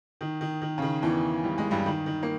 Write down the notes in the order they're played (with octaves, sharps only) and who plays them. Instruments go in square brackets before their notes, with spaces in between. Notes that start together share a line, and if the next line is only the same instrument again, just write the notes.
[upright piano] D#3
D#3
D#3
C#3
D#3
E2 E3
G3
G#3
G2 G3
D#3
D#3
A#3